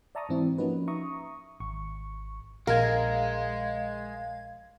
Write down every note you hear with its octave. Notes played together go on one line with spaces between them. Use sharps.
D5 E5 A5 A#5 C#6 D#6
G#2 E3 C4 E4
F3 A#3 C#4 D#4 F#4 B4
E5 A#5 C#6 D#6
G#1 C#6
A#1 G#3 A#4 F5 G#6